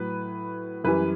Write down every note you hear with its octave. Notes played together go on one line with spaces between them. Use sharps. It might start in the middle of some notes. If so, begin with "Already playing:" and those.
Already playing: A2 F#3 B4
F#2 E3 G3 B4